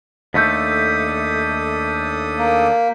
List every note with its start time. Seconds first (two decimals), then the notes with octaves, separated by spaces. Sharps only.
0.34 D#2 A3 D4 A4 D#6 G6 B6
2.38 A#3